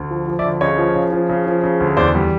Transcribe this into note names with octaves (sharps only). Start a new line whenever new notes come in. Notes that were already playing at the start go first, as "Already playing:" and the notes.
Already playing: D2
F3
F3
D5 E5
D2
C#3 C#5 D#5
F3
C#3
F3
C#3
F3
C#3
D2
E2 C5 D5
G3